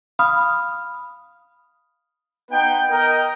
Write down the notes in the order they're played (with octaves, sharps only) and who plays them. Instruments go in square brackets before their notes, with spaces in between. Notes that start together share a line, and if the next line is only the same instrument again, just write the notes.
[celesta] F5 B5 D#6 F6
[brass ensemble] B3 D#4 B4 G5
A#4 D#5 G5